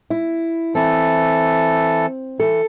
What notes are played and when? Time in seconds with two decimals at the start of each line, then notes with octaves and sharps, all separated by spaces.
0.10 E4
0.75 E3 C4 A4
2.40 E3 A4